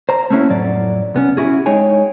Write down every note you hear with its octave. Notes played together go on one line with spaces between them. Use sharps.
C5 A#5
A3 A#3 C4 C#4 E4 F#4
F2 A2 F#3 D5
C2 B3 C#4
C#4 E4 F#4 G#4
G#3 D#4 G#4 C#5 G5 G#5